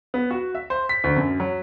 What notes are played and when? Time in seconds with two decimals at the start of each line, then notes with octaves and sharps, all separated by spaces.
0.14 B3
0.31 F#4
0.55 E5
0.70 C5
0.89 B6
1.04 D2
1.16 F#2
1.40 F#3